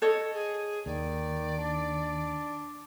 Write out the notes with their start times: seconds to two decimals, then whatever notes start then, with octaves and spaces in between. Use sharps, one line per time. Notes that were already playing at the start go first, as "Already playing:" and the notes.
0.02 A4 C#5 D#5
0.33 G#4
0.86 D#2 D#3 D5
1.57 D4